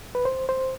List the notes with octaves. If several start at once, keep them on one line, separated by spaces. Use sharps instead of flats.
B4
C5
C5